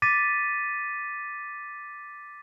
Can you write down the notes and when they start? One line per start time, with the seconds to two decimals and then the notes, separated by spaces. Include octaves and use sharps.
0.02 D6 A6 B6 D#7